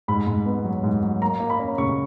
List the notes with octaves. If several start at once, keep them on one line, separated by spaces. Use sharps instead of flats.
G#2 B5
G#2
B3
F#3
G#2
F#3
A#3 A#5
A#3
B5
C#4
C#3 C#6